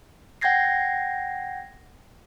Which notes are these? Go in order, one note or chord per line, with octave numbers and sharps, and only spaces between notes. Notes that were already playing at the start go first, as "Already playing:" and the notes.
F#5 G5 G6 G#6 A#6 C7